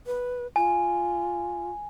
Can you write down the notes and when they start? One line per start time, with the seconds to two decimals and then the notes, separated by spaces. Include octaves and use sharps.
0.06 B4
0.56 F4 G#5